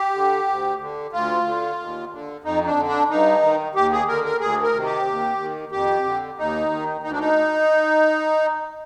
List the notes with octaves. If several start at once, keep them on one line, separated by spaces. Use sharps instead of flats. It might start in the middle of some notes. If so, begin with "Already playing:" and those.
Already playing: G4
D3
D2
D3
D2 F4
D3
D#2
D3
F2 D#4
D4
D3
D4
G2 D#4
D#3
D#2 G4
G#4
D3 A#4
A#4
D2 G#4
A#4
C3 D#3
G4
D#2
D#3
F2 G4
D3
D#2 D#4
D#3
D2 D#4
D4
D#4